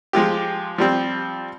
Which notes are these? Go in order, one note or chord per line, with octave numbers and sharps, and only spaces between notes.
F3 G#3 F4 G4
F3 G3 C4